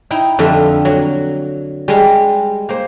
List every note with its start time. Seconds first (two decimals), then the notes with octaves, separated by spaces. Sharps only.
0.11 D#4 E4 G5
0.39 F2 D3 G3 F4 E5
0.85 F#3
1.88 G3 G#3
2.69 A#3 C5